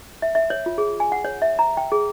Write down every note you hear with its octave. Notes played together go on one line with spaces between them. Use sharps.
E5
E5
C#5
F4
G#4
G#5
F#5
C#5
E5
A#5
G5
G#4